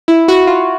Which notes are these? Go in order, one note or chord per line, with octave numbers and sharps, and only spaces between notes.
E4
F#4
F4